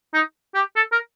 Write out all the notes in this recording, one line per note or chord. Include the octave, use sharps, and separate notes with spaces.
D#4
G4
A4
A#4